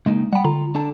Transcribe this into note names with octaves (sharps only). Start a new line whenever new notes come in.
C#3 G#3 A#3 D#4
G3 F#5 G5 B5
D3 F4 A#5
D4 A4 A5